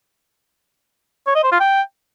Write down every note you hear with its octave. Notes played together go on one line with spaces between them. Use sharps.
C#5
D#5
C5
F4
G5